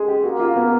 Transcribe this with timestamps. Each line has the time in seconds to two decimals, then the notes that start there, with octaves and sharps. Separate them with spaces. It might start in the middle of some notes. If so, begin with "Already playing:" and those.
Already playing: G#3 G#4 A4
0.08 G4
0.23 A#3 F#4
0.40 F4
0.56 B3